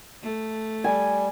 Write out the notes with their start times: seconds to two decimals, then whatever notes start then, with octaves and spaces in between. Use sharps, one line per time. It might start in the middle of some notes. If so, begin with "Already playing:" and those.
0.22 A3
0.84 G3 G#5